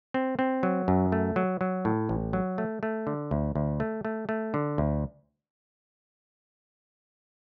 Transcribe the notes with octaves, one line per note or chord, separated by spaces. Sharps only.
C4
C4
F#3
F#2
A3
F#3
F#3
A2
A1
F#3
A3
A3
D3
D2
D2
A3
A3
A3
D3
D2